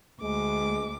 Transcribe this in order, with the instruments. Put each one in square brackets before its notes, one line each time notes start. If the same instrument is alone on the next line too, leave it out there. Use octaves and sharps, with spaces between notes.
[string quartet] D2 D6 [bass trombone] G#3